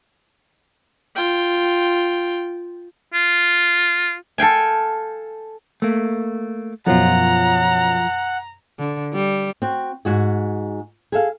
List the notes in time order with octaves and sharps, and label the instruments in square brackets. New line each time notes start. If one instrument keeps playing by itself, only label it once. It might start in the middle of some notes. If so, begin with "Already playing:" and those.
[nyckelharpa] F4 G5
[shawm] F4
[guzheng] A4 F5 G5 G#5
[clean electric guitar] A3 A#3
[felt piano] F#2 B2 [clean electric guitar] F3 F4 [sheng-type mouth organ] F#5 [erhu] A#5
[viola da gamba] D3
G3
[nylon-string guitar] C4 F#4
G#2 F#4 G#4
G#4 A4 F5